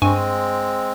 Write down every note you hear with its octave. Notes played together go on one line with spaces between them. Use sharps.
G2 G#3 C4 G#5 C#6